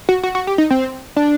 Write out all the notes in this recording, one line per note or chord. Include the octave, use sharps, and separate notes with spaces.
F#4
F#4
F#4
G4
D#4
C4
D4